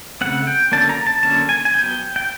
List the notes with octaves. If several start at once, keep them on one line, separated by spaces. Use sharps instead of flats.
C#3 F3 A3 C4 F#5
G5
D3 F#3 A#3 C#4 A5
A#5
A5
D3 F#3 A#3 C#4 A5
G#5
G#5
F#3 B3 G5
G5